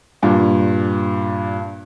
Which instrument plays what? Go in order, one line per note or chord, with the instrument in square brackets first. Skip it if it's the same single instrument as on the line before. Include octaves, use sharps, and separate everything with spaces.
[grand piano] G2 A#2